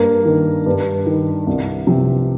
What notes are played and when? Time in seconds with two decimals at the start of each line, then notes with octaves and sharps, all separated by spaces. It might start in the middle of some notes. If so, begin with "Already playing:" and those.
Already playing: G2 A#3
0.25 D#3
0.66 G2
1.06 D#3
1.47 C2
1.87 C3 F3